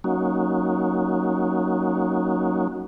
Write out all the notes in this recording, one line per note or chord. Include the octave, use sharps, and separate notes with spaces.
F#3 A#3 C#4 D#4 F#4